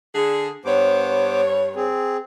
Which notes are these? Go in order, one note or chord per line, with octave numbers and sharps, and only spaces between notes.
D3 G#4
G2 B3 C5 C#5 D6
C4 G#4